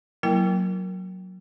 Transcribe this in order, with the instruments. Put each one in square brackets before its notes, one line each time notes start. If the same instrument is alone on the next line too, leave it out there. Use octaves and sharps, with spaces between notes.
[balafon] F#3 A#3 E4 A#4 G5